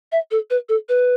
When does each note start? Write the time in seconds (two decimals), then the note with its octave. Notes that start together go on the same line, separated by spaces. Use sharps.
0.12 E5
0.31 A4
0.50 B4
0.69 A4
0.89 B4